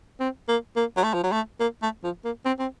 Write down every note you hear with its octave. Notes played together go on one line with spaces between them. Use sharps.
C4
A#3
A#3
F#3
A3
F3
F#3
A3
A#3
A3
F3
A#3
C4
C4